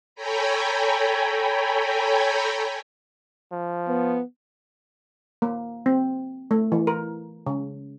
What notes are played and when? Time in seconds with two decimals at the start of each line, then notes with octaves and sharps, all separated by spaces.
0.15 A4 C#5 G5 G#5 A#5 B5
3.52 F3
3.88 B3
5.42 A#3
5.86 C4
6.51 A3
6.72 E3
6.87 A#4
7.47 C#3